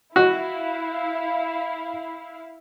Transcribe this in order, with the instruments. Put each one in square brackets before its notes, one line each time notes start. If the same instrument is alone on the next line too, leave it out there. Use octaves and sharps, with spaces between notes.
[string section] E4 F5 [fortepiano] F#4